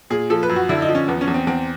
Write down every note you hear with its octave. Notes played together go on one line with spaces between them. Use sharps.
A#2 G#4
F3 A4
B4
F#2
F#4
D3 E4
D#4
F3
C#4
E2 B3
C#4
E2
C4
E2 C4